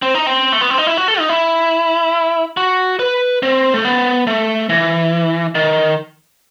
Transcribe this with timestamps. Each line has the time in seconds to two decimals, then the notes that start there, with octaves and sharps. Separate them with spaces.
0.02 C4
0.15 D#4
0.26 C4
0.52 A3
0.61 B3
0.70 C4
0.78 D#4
0.87 E4
0.97 F#4
1.08 A4
1.19 D#4
1.29 E4
2.57 F#4
2.99 B4
3.43 C4
3.74 A3
3.85 B3
4.27 A3
4.69 E3
5.55 D#3